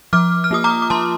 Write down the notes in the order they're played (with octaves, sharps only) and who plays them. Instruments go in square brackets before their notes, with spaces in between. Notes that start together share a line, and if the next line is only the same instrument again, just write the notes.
[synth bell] F3 D6 F6
F6
A#3 F4 D#6
A#5 D6
D6
F3 A5 C6